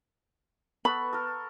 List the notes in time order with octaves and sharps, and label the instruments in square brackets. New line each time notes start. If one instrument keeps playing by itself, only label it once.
[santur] B3 A4 C#6 [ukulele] B5
[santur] A4 A#4